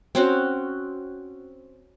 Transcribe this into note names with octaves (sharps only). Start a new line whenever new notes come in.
C4 C#4 F#4